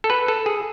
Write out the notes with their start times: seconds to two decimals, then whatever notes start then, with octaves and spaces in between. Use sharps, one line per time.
0.04 A4
0.10 B4
0.28 A4
0.46 G#4